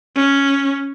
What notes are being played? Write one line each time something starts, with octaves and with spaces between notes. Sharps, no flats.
C#4